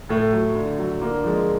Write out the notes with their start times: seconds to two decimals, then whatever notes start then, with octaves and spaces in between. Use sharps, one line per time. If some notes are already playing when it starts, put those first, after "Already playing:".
0.09 A2 A3
0.33 F#3
0.56 D3
0.79 F#3
1.01 D3 A#3
1.24 F3 G#3